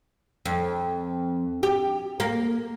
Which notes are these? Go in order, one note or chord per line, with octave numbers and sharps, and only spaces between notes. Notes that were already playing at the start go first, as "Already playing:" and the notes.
F2
G4
A#3